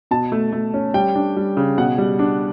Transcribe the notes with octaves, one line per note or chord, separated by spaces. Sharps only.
B2 A5
A3
A3
C#4
G3 G5
D4
G3
C#3
B2 F#5
G3
D4